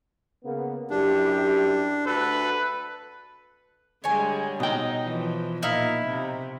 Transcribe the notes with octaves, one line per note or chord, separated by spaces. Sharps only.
C#3 A#3 B3
F#2 D4 E4 G4
D2 A4 B4
D3 G3 G#3 C#5 G#5
B2 D#4 G5
E3 F3
A#2 D#4 E4 F5
C3